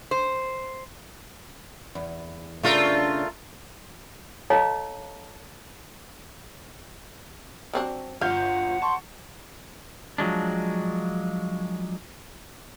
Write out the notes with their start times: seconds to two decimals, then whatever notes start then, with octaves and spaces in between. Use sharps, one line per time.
0.11 C5
1.95 E2
2.63 C#3 A3 D4 F4 A#4
4.50 A4 C#5 D#5 F5 A5 A#5
7.73 F#3 C4 D4
8.21 G1 F4 F5 F#5 G6
8.82 A5 C6 C#6
10.18 F3 F#3 G#3 D4